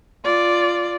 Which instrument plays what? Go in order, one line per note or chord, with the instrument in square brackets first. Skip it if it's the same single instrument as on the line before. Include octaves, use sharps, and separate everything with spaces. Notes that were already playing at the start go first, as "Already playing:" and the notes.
[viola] F4 D5